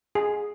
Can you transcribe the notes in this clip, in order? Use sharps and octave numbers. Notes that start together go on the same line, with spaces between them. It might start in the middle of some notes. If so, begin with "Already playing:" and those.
G#4